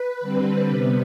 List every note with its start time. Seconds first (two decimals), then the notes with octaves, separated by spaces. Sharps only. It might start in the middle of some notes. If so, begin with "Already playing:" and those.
Already playing: B4
0.20 D3 G3 C4
0.67 C3 G3 B3